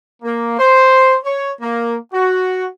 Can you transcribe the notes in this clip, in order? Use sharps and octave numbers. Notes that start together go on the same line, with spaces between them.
A#3
C5
C#5
A#3
F#4